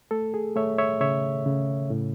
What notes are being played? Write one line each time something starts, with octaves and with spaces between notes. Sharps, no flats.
A3 A4
G#4
A3 C#5 E5
C#5 E5
C#3 C#5 E5
C#3
A2